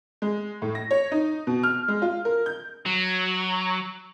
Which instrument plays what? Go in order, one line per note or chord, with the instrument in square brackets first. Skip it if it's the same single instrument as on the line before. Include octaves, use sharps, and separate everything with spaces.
[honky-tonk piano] G#3
A2
A#6
C#5
D#4
B2
F6
G#3
F4
A#4
G6
[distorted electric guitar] F#3